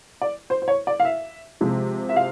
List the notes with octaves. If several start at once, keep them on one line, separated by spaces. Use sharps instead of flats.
D5
C5
C5
C#5
D5
F5
E5
C3 F3 G#3
E5
F5